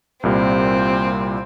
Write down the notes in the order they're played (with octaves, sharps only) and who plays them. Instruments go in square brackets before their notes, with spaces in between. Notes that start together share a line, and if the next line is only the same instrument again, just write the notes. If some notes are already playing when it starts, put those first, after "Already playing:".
[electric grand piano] C2 A#2 G3 [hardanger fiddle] C4